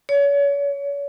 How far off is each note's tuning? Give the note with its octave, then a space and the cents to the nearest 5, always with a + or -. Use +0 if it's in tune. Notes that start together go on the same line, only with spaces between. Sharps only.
C#5 +35